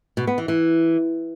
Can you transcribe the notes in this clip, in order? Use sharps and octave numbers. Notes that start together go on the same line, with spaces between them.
B2
B3
E3
E3